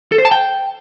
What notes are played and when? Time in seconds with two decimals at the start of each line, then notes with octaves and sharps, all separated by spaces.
0.12 A4
0.18 C5
0.25 A5
0.31 G5